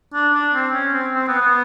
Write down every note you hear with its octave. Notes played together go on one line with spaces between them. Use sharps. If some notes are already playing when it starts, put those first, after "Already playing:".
D4
D4
C4
C#4
C4
C4
B3
B3